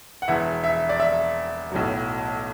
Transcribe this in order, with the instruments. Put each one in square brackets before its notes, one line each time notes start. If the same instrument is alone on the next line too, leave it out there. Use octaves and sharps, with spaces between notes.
[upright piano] F#5
E1 E2 E3 E5
E5
D5
E5
B1 A2 F#3